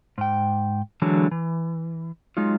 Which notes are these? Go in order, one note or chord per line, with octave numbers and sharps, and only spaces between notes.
G#2 G5
D3 E3 F#3 G#3 D4
E3
F#3 G#3 D#4 F4